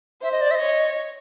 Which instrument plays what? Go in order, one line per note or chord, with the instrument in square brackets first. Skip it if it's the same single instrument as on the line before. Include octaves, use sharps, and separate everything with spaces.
[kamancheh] C5 [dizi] E5
[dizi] D#5
D5
E5
D#5
[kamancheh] C#5